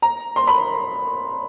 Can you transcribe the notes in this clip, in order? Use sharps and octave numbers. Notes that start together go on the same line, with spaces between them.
A#5
C6
B5